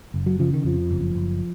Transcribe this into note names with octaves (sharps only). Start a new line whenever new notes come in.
F#1
F#3
C#3 F3
D#3
F2 F3
F#1
F#1